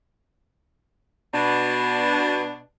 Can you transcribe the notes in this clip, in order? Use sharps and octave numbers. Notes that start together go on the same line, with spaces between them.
B2 D4